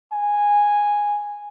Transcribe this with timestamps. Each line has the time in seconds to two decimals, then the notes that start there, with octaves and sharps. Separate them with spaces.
0.12 G#5